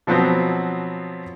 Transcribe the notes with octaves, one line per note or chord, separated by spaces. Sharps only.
B2 F3 F#3 B3 C4